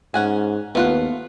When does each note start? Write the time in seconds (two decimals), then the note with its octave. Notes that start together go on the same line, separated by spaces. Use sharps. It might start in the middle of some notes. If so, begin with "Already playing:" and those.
0.14 G#2 C#4 F#5 G#5
0.75 D#2 A3 B3 F4 F#5